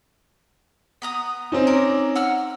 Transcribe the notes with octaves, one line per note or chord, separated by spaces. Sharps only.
B3 A#5 D#6
C4 C#4 D#4
A#4 D5
F#5 E6 F6